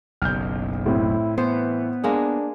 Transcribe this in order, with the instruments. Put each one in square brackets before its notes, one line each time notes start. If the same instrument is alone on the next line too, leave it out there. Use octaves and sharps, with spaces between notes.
[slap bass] F#1 B1 [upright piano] F6 G6
[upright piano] A2 C4 [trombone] E4
[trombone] E3 [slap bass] B3 [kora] C5
[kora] G#3 A#3 G#4 [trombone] D4